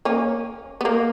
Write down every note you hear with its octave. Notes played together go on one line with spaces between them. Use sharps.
A#3 C#4
B3
A#3